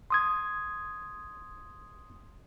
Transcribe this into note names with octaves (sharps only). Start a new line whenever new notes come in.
C6 D#6 G#6